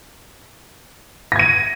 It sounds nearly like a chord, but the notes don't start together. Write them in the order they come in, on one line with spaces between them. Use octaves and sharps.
A#6 G#6 D#7